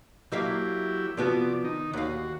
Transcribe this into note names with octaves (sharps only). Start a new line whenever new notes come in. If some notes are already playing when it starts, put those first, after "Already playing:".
F#3 A#3 E4 G4 E5 F5
C3 F3 B3 F#4 D5
D#3 D#4
D#2 F#4 F5